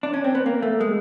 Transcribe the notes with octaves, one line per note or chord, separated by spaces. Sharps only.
D4
C#4
C4
B3
A#3
A3
G#3